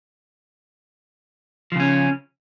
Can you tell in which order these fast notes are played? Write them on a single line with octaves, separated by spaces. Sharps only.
F3 C#3 C#4